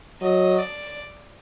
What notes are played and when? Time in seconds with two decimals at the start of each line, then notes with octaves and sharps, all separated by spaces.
0.22 F#3 D#5
0.59 D5